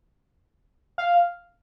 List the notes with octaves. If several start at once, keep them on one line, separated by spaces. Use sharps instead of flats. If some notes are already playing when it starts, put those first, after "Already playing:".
F5